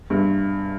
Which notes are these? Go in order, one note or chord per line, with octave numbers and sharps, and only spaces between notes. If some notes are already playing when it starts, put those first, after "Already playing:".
G2